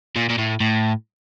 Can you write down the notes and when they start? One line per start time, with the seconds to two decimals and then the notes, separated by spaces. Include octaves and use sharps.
0.16 A#2
0.29 A#2
0.38 A2
0.60 A2